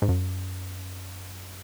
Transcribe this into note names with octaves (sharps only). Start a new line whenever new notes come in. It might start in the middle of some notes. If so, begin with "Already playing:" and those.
G#2
F#2